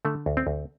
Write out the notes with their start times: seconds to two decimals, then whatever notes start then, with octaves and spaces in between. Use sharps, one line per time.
0.05 D3 A3
0.26 D2
0.37 C4
0.47 D2